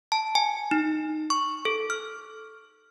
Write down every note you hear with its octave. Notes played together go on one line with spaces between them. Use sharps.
A5
G#5
D#4
C#6
A4
F6